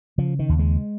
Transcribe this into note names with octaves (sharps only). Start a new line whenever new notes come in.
C#3 F3
D#3
D#2
G#3